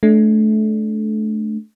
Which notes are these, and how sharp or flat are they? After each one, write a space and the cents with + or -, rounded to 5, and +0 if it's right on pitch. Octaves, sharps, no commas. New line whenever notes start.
A3 -25 D4 +0